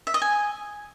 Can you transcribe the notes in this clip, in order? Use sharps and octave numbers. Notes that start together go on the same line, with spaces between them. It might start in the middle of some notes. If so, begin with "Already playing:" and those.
E5
D#5
G#5